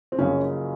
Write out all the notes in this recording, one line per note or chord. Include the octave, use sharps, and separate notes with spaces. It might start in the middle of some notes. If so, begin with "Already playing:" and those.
C4
F#1 F#2 C#3 F3 C#4